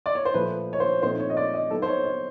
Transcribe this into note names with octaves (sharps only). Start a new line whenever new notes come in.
D5
C#5
C5
A#2 F3 A3 B4
C#5
C5
A#2 F3 A3 C4 D#4 C5
C#5
D#5
D5
D#5
F#3 B3 D#4 A4
C5
C#5
C#5